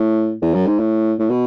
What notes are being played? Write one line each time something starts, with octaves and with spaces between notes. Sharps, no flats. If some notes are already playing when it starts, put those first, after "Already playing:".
Already playing: A2
E2
F#2
G#2
A2
A2
B2